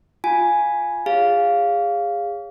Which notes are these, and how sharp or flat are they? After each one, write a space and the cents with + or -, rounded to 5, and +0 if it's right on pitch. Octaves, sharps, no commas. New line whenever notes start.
F4 +0 G#5 +0
G#4 -30 C#5 +0 F5 +0